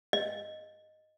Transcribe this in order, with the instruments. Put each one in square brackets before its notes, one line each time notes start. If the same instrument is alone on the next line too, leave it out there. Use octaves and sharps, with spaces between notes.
[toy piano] D#5